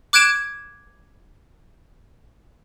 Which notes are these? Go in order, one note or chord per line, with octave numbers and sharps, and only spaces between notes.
D6 F#6 G#6 D7 E7